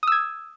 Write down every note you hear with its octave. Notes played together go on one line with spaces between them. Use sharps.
D#6 E6 G#6